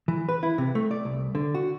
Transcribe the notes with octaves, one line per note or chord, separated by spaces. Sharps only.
E3
B4
E4
C3
A3
D5
C2
D3
F#4